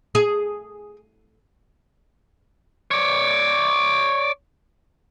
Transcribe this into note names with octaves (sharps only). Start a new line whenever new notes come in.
G#4
C#5 D5